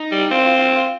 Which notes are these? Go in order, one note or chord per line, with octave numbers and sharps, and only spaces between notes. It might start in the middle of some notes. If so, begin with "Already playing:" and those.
Already playing: D#4
G3
C4 F4
F4
F4
F4